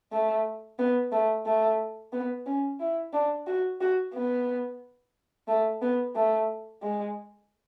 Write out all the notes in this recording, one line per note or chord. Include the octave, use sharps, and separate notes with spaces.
A3
B3
A3
A3
B3
C#4
E4
D4
F#4
F#4
B3
A3
B3
A3
G#3